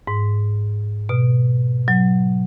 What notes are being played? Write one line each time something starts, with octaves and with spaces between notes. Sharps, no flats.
G#2
B2
F#3